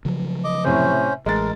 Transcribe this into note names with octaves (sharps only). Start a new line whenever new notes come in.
C#3 F3 F#3
D#5 D6
A2 C3 C#4 C5
A1 G#3 A#4 A6